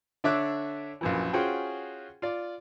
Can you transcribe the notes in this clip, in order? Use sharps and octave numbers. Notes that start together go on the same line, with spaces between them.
D3 D4 C#5 E5 D6 F#6
A#1 F#2 E3
C#4 F4 F#4 G#4 C5 G5
F4 D5